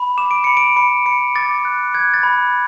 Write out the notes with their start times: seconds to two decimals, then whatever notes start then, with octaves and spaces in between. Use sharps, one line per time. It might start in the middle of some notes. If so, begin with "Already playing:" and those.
Already playing: B5
0.18 D6 E7
0.31 D7
0.44 B5 C#7
0.57 D7
0.76 B5 C#7
1.06 B5 C#7
1.36 D6 A6
1.65 F#6
1.94 F#6 G#6
2.14 A6
2.23 B5